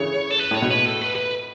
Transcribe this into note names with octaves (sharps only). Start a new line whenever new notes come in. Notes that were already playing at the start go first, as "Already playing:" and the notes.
Already playing: C#3 E3 A3 C#5
A4
B4
A2
C#5
B2
B4
A4
B4
B4